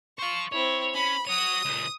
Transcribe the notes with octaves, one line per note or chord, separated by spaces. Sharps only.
C5 F5 C#6
C4 E4 C#5
C#4 B5
F#4 C#5 D#6 D#7
C#2 A#2